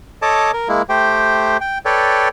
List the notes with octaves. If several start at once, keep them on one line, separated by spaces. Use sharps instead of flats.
A4 C#5 D#5 A5 D6
A#4
G#3 A#3 E4
A3 G4 C5 G5
G5
A4 B4 C#5 D5 G5